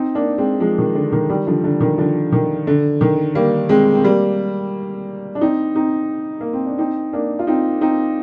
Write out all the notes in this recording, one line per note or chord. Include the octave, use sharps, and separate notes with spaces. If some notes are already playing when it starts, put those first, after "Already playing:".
Already playing: C4 D#4
A#3 D4
G#3 C4
F3 G#3
D#3
D3
D#3
D#3 G3
D3 F3
D3
D#3
D3 F3
D#3
D3
D#3
G3 A#3
G#3 C4
C4
G3 A#3
D4
C4 D#4
C4 D#4
A#3
C4
D4
C4 D#4
A#3 D4
F4
C4 D#4
C4 D#4